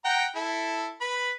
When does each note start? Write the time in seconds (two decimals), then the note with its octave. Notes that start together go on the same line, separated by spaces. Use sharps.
0.05 F#5 G5 A#5
0.36 E4 A4
1.01 B4 B5